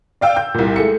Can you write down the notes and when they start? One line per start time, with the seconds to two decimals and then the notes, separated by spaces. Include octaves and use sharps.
0.21 D5 F5 G5 E6
0.37 G6
0.54 C2 A#2
0.76 G#3 A3 C#7